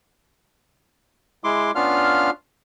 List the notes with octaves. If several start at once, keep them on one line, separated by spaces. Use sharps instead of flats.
G#3 E4 C6 D6
B3 C#4 D4 F4 F5 F6